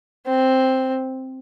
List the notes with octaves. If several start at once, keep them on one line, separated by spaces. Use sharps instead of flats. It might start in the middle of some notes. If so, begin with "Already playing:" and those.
C4